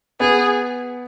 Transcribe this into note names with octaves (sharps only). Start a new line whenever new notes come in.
B3 G#4